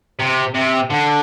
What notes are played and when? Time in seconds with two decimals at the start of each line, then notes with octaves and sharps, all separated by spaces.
0.19 C3
0.55 C3
0.90 D3